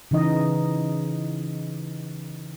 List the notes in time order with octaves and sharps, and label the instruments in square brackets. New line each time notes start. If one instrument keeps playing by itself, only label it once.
[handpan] C#3 E3 D#4 D#5